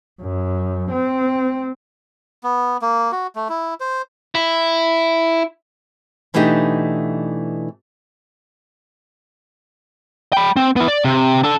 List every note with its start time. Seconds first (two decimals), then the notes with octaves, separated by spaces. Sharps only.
0.22 F#2
0.91 C4
2.43 B3
2.82 A#3
3.12 F#4
3.36 A3
3.49 E4
3.80 C5
4.35 E4
6.34 B2 E3 A3 D4 D#4 G4
10.33 G5 B5
10.56 C4
10.76 B3 E4
10.88 D5
11.04 C3
11.43 D4 A4